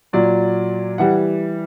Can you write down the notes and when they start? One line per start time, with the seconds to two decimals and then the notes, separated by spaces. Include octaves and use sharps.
0.13 A#2 F#3 D5
0.98 E3 G3 F#5